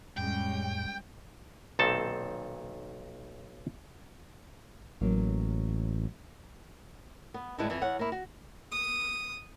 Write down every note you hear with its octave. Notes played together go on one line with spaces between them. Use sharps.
F2 A2 G3 G#3 C#4 G5
B1 A#2 D#3 C4 A4 A5
A1 F#3 A#3
B3
A2 D3 G3 G#3 E4 B4
F2 E3
E2 C#5 F#5
A#3 E4
F#4
D#6